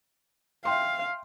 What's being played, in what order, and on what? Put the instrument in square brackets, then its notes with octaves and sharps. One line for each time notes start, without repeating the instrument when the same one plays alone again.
[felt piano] E5 G5 C6 [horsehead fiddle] F5